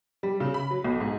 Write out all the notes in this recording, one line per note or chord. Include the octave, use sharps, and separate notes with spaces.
G3
C#3
B5
F#3
B1
G#2